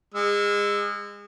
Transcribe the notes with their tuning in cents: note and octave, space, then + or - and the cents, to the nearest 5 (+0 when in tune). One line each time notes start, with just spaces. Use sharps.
G#3 -30 E6 +0